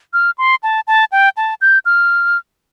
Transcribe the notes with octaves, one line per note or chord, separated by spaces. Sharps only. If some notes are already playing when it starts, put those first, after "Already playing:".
F6
C6
A5
A5
G5
A5
G6
F6